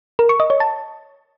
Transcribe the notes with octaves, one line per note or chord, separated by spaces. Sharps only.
A#4
C#6
D#5
C#5
A5